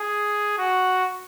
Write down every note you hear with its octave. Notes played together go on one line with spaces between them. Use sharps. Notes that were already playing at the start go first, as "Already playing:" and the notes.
Already playing: G#4
F#4